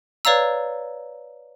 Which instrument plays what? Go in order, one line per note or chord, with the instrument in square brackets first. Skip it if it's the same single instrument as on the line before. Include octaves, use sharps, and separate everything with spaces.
[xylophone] B4 C#5 D5 F5 A#5 E6